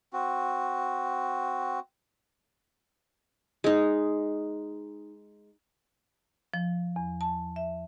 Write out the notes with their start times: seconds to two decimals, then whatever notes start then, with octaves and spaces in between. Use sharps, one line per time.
0.13 C4 F#4
3.64 G#3 D#4
6.54 F3
6.96 E2
7.21 A5
7.56 E5